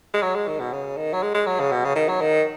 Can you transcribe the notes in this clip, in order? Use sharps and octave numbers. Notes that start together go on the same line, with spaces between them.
G#3
F#3
G#3
D#3
B2
C#3
D#3
F#3
G#3
G#3
F#3
C#3
B2
C#3
D#3
F#3
D#3